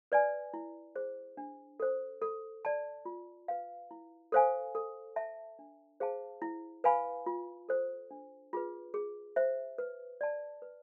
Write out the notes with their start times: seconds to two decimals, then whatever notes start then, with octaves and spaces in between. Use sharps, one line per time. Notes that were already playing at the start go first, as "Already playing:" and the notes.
0.12 B4 D5 G#5
0.54 E4
0.95 G#4 C5
1.37 D4
1.80 A4 C5
2.22 A4
2.65 D5 A5
3.05 F4
3.48 B4 F5
3.91 E4
4.32 A4 C5 F5 G#5
4.75 A4
5.16 E5 A5
5.59 D4
6.00 G#4 C5 F5 A5
6.42 E4
6.84 B4 F5 G#5 B5
7.26 F4
7.69 A4 C5
8.11 D4
8.53 F4 G#4 B4
8.94 G#4
9.36 C5 E5
9.78 B4
10.21 D5 A5
10.62 B4